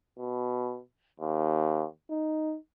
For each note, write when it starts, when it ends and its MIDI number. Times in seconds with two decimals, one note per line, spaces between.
0.18 0.80 47
1.20 1.85 39
2.11 2.56 63